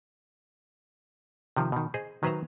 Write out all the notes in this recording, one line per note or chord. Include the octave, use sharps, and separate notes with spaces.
C3 D#3 F3
B2 D#3
G#4 C5 D#5
D#3 F#3 B4 C5 E5 A#5